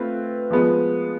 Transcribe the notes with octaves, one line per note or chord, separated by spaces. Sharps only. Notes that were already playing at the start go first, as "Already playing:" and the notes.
Already playing: A3 C4 F4 B4
F3 G#3 B3